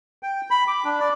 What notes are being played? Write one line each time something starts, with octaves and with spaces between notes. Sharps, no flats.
G5
B5
D6
D4
D5